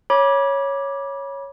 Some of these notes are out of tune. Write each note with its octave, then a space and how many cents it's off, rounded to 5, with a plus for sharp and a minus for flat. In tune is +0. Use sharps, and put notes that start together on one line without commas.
C#5 +0 B5 -35 D6 +0